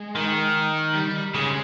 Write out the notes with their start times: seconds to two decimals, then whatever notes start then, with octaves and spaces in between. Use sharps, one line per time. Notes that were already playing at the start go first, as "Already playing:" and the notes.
Already playing: G#3
0.15 D#3
0.95 G3
1.35 C#3 G#3